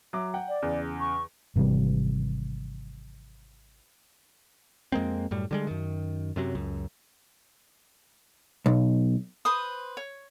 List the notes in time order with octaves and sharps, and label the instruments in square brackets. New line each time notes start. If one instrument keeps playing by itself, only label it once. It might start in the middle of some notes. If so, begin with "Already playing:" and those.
[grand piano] F#3 E5 D6
F#5 G5
[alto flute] D5
[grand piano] E2 C#3
[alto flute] C#6
[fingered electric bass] G#1 C3 E3 G3
[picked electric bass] F2 G#3 A#3 C4
F#2 A2 G3
D3 G3 G#3
F#2 D#3
F#2 C3 F#3
C#2 F#2
[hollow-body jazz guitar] B1
[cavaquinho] B4 C5 D#6
C#5